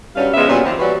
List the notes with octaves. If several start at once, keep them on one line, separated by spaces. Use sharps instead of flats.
G2 F#3 G3 C#4 F5
C#3 F3 G#3 B3 E5
A#2 F#3 G3 B3 C#4
D#2 C3 F3 C4
E3 F#3 G3 F#4